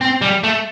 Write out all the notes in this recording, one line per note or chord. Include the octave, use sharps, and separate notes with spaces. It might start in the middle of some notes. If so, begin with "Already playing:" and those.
C4
G3
A3